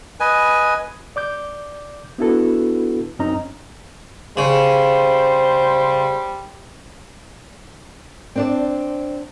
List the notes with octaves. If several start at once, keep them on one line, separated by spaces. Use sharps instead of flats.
B4 D#5 G#5
D5 D6 G6
B3 D4 E4 F#4 A4 B4
F#2 C4 C#4 D#4 D#5 A#5
C#3 G3 C5
C4 D4 D5